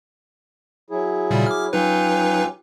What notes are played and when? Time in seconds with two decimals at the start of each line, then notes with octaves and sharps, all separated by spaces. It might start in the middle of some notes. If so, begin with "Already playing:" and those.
0.90 F#3 E4 G#4
1.30 A#2 C#3 G3
1.46 D6 F6
1.73 F#3 C#4 D#4 F4 G4 B4